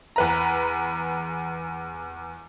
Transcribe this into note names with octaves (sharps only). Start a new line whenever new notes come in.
E2 B4 A#5